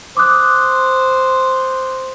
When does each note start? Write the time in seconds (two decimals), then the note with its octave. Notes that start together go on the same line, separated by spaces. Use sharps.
0.17 C5 D6 D#6 F#6